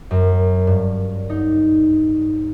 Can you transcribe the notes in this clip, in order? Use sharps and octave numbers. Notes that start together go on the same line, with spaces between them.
F#2
G2
D#4